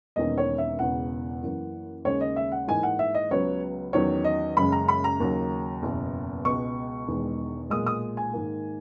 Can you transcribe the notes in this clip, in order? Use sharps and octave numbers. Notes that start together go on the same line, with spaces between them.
E1 E2 D#3 A#3 C#4 D#5
C#5
E5
E1 E2 C#3 E3 F#5
F#2 E3 A#3
D#2 C#3 G#3 C#4 C#5
D#5
E5
F#5
G#2 E3 A#3 D#4 G#5
F#5
E5
D#5
C#2 C#3 F#3 B3 C#5
E2 D#3 F#3 C#4 C#5
D#5
F#1 F#2 C#3 G#3 B5
A#5
B5
A#5
D#2 C#3 F#3
F#1 E2 B2
C#2 B2 G#3 C#6
E1 E2 D#3 G#3
B1 A#2 G#3 D#6
D#6
G#5
G#2 D#3 A#3